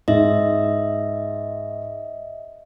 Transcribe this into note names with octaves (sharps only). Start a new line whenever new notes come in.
G#2 D#5 E5